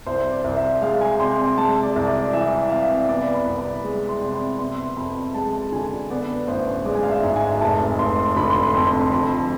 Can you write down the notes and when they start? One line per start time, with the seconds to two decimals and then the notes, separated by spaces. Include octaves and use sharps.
0.06 C2 C5
0.32 D5
0.44 C2
0.56 E5
0.82 G#3 F5
1.01 G#5
1.20 C3 C6
1.58 G#3 A5
1.83 D5
1.96 C2
2.07 D5
2.33 E3 E5
2.71 C3 F5
3.08 B3 D5
3.34 B5
3.46 C2
3.59 B5
3.84 G#3
4.09 C6
4.21 C3
4.34 B5
4.59 B3 C6
4.97 F2 B5
5.34 G#3 A5
5.72 D3 G#5
6.10 B3 D5
6.48 A1 C5
6.85 G#3 D5
6.95 G#5
7.03 F5
7.11 E5
7.23 G#2
7.36 G#5
7.61 F1 A5
7.99 F1 C6
8.36 D3 B5
8.50 C6
8.62 B5
8.74 F2
8.87 C6
9.12 F3 B5